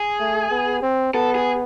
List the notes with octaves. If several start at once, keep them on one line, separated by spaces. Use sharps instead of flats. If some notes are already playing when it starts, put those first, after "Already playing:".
Already playing: G#4
A3
B3
C4
B3 A4
G#4